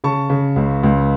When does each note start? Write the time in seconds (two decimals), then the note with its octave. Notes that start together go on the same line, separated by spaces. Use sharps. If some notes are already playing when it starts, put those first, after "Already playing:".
0.04 C#3 A5 C#6
0.30 C#3
0.56 C#2
0.83 C#2